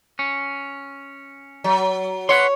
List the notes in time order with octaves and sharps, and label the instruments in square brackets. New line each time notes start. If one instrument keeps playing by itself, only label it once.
[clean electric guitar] C#4
[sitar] F#3
[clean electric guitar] B4 F#5 C6 [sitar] C#5